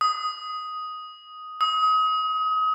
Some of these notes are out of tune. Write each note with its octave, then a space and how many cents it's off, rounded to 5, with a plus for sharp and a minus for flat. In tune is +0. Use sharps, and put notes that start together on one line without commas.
D#6 +5
D#6 +30